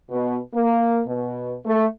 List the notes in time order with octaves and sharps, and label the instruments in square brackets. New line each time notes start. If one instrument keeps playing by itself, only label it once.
[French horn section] B2
A#3
B2
A3